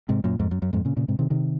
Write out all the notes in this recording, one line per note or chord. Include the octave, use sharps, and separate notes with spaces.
G#2 C3
F#2 A#2
F2 G#2
F#2
F#2
F2 G#2
A#2 C#3
A#2 C#3
G#2 C3
C3 D#3
C3 D#3